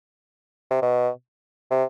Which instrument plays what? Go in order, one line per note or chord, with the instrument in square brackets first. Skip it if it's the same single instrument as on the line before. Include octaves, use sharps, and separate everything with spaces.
[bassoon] C3
B2
C3